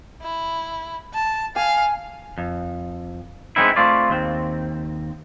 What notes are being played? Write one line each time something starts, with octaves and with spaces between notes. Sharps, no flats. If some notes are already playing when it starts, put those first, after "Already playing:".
E4
A5
F5 G#5
F2
G#3 A3 B3 C4 D#4 E4
A3 C4 F4 D5
D#2 C4